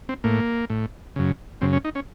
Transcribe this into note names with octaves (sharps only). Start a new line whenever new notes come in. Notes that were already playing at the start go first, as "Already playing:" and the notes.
C4
A2 A#3
A2
F#2 C#3
F#2 C#3 C4
C#4
D#4
C#4